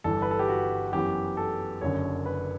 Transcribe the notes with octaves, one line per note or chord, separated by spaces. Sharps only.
G1 G2 E3 A4
B4
A4
G4
F#4
F#2 E3 B3 G4
A4
F#1 F#2 D3 C#5
B4